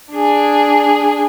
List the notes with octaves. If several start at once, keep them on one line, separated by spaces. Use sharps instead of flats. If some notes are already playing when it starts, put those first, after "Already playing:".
D4 G#4